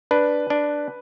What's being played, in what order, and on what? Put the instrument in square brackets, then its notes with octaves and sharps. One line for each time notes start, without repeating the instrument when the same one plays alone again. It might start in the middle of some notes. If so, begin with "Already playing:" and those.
[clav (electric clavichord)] D4 [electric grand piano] B4
[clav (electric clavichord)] D4